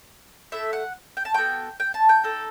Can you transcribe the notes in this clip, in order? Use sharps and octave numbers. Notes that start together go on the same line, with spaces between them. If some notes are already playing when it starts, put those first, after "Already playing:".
A3 E4 A4 E5
F#5
G5
A5
B3 F#4 A4 G5
G5
A5
G5
D#4 A4